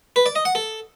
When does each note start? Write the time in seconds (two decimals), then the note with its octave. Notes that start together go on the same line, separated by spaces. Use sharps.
0.16 B4
0.26 D5
0.36 D#5
0.45 F#5
0.55 A4